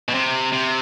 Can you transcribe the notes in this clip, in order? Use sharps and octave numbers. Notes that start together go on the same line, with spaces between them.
B2
C3
C3